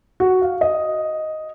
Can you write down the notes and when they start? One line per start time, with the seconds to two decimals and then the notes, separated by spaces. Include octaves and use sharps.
0.20 F#4
0.42 F5
0.61 D#5